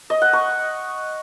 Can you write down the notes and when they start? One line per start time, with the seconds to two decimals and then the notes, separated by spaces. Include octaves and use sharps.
0.10 D#5
0.22 F#5
0.33 C#6